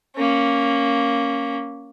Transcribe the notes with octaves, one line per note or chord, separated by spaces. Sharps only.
A#3 C#4